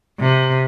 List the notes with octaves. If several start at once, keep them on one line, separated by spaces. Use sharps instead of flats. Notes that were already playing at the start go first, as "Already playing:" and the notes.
C3